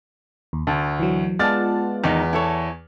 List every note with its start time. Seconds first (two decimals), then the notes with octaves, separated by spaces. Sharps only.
0.53 D#2
0.67 D2 A5
1.00 E3 F#3
1.39 G#3 B3 F4 D5 F#5 A5 F6 A6
2.04 E2 D#3 D#4
2.33 E4 A4 C#5 G#5